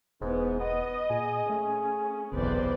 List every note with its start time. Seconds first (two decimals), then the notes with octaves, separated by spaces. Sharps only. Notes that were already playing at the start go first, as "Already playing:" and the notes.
0.21 E1 G#2 E3 B3
0.60 B3 D#5
1.10 A#2 G#4
1.50 A3 C#4
2.32 F#1 B1 E2 C3 B4 C5 D5